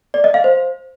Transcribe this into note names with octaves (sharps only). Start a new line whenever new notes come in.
D5
D#5
F5
C5